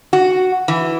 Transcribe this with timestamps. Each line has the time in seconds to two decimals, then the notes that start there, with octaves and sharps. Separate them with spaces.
0.13 F#4
0.68 E3